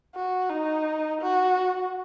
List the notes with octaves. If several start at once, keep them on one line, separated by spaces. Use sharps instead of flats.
F#4
D#4
F#4